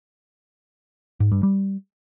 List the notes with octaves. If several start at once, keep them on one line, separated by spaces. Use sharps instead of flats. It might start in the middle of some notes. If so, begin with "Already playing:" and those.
G#2
G2
G3